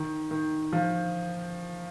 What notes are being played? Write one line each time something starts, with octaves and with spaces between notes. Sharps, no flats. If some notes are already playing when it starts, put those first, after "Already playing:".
Already playing: D#3
D#3
F3